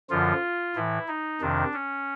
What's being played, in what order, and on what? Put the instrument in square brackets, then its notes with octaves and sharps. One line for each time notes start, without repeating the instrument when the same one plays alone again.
[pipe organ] F#2 D3 F3 F4
A2 E3 E4
D#4
F2 C3 D#3 D4
C#4